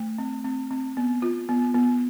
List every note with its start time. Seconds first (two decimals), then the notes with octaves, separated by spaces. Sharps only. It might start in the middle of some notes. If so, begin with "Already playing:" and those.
Already playing: A3
0.18 C4
0.44 C4
0.71 C4
0.97 B3
1.22 F4
1.49 B3
1.74 B3